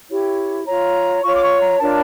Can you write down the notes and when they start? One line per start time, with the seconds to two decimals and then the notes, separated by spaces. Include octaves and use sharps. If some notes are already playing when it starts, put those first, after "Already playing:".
0.08 E4 G4 C#5
0.66 F4 C#5 A#5
1.23 F4 C#5 C#6
1.34 D6
1.42 C#6
1.61 A#5
1.80 D4 F4 A#4 C#5 A5